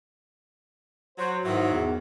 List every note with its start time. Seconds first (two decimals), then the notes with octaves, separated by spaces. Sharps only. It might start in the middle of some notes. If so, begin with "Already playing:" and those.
1.18 F#3 C5
1.44 G#2 D#3 E3 F#3
1.72 E2